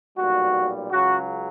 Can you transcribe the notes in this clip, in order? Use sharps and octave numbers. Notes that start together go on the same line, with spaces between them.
B1 A#2 G3 F#4
C#2 C#3 F#3 F#4